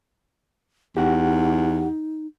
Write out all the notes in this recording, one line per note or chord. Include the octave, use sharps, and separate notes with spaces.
E2 D#4 G4 F#5